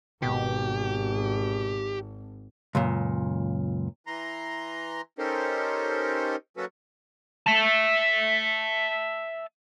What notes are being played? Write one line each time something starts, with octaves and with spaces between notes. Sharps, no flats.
G#1 B2 G4
C#2 F#2 A#2
E3 A#5 C6
C#4 D#4 G4 A4 A#4 C5
F#3 A#3 C#4 F#4 A4 B4
E5 A5